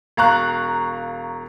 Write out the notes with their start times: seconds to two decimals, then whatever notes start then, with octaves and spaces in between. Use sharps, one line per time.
0.17 E1 F5 A#5 C#6 F#6